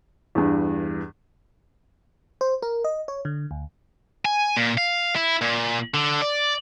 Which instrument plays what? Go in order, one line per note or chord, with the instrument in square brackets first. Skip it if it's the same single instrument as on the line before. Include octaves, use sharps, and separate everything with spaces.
[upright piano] E2 G2
[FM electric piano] C5
A#4
D#5
C#5
D3
D2
[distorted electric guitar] G#5
A#2
F5
E4
A#2
D3
D5